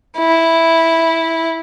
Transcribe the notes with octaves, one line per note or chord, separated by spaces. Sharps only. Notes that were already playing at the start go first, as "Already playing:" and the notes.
E4